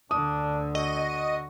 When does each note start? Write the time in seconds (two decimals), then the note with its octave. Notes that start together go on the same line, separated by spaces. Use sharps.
0.11 D2 D3 D4 D#6
0.75 F#4 D#5